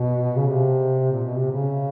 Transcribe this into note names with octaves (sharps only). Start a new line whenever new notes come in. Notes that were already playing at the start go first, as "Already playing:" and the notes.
Already playing: B2
C#3
C3
A#2
B2
C3
C#3